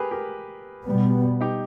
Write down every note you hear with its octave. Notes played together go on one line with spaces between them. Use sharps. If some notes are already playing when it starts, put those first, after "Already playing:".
Already playing: G4 G#4 A#4 B4
G4 A#4
B2 G3 B3
D#4 G4